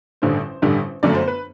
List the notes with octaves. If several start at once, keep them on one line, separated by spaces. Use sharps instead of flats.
A1 G2 D3 G3 C5
A1 G2 D3 G3
G1 F#2 D3 F#3 A3 D5
C5
B4